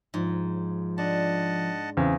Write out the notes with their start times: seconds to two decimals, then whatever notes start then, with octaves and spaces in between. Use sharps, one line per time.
0.14 G#2 F3
0.98 D4 D#5 F#5 A5
1.97 E2 C#3 C4